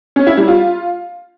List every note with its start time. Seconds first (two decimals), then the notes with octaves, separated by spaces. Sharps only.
0.16 C#4
0.27 E4
0.37 G3
0.48 F4